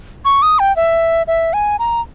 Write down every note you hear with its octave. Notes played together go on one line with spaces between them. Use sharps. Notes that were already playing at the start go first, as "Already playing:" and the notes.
C#6
D#6
G5
E5
E5
G#5
A#5